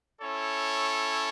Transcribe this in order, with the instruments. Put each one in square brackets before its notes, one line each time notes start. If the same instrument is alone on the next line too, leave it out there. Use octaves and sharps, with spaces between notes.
[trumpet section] C#4 E4 A4 C#5